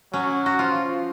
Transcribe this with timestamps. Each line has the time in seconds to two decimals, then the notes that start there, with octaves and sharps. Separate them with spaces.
0.13 F#3 C#4
0.46 F#4
0.59 F3 F4